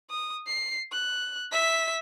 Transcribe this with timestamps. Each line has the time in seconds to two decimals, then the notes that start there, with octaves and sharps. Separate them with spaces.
0.10 D#6
0.47 C7
0.92 F#6
1.52 E5 B6